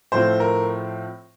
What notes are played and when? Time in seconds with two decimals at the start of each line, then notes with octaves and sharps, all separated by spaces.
0.12 A2 F3 A3 C4 C5
0.40 A#4